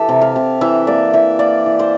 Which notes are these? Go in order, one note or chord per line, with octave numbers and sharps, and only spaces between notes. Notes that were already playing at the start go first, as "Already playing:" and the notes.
Already playing: E3 G4 A4 E5
C3
F5
C3
E3 E5
A#3 D5
E3 E5
A#3 D5
E3
C5